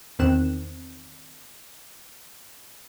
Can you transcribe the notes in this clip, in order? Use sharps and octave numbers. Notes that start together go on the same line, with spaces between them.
E2 D#3 C4 F#6 E7